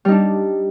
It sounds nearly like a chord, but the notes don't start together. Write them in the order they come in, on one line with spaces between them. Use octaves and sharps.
G3 D#4 D4